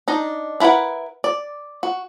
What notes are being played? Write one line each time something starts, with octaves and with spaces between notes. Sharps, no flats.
D4 D#4 D#5
D4 E4 A#4 B4 F#5
D5
F#4